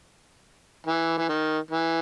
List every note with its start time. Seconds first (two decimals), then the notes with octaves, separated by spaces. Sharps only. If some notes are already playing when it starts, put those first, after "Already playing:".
0.86 E3
1.18 E3
1.29 D#3
1.71 E3